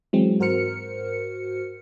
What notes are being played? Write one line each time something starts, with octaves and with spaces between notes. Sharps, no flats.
E3 F#3 G#3 C4
G#2 F#4 A#4 C5 F6 C#7